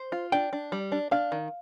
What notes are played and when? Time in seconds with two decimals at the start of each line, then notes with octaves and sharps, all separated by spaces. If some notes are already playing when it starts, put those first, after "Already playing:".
Already playing: C5
0.12 F4
0.32 D4 G5
0.53 D4
0.72 G3
0.92 D4
1.11 D4 F5
1.32 D#3